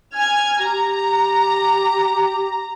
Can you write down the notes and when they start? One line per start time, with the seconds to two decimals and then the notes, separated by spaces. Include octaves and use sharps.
0.16 G#5 F6 G#6
0.60 G4 A#5